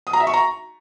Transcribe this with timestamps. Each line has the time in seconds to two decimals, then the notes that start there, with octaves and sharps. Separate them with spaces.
0.07 D#6
0.13 A#5
0.20 E5
0.27 C#6
0.34 A#5